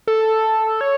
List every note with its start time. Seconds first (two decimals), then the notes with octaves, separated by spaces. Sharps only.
0.07 A4
0.81 C#5